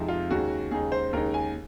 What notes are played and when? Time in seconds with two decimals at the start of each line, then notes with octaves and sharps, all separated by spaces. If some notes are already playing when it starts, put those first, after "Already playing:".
Already playing: F2 C3 F3 G#3 D#4
0.08 F4
0.30 D#2 C#3 G#3 D#4 F#4
0.71 D#2 C#3 G#3 D#4 G#4
0.92 C5
1.13 D#2 C#3 G#3 D#4 A#4
1.34 G#5